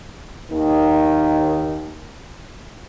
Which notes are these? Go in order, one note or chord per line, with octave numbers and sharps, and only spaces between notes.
D#2 D#3